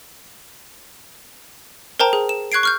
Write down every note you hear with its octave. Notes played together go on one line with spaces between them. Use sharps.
A#4 C5 G5 A5 A#5
G#4
E7
C#6 F#6 G#6 C7 D7
C#6 F6 G6